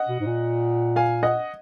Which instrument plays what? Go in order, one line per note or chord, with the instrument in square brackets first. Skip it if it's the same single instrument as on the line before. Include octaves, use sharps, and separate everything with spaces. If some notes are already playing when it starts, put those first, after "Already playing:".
Already playing: [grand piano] D#5 F#5
[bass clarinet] B2
G#2
A#2
[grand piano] F5 G#5
D#5 F#5